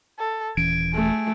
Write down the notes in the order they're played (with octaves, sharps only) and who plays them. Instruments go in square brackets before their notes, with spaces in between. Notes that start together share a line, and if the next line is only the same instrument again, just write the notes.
[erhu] A4
[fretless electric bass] D#1 E3 C#4 [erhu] G#6 [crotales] D7
[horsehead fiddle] A3 [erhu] G#4